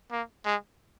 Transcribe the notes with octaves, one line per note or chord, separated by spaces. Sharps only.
A#3
G#3